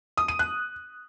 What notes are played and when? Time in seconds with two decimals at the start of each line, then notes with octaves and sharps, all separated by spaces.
0.17 D#6
0.28 D#7
0.39 F#6